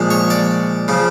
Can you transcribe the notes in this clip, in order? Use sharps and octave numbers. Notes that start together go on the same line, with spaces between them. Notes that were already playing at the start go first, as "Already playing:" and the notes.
Already playing: A#2 F3 G#3
C#5
D5
C#3 F3